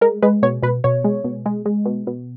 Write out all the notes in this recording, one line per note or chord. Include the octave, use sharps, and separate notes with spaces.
G#3 A#4
G#3 B4
B2 C#5
B2 B4
B2 C#5
G#3
B2
G#3
G#3
B2
B2